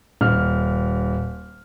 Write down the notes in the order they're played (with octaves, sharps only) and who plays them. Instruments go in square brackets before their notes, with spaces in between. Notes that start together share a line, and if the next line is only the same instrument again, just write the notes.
[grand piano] D#1 F6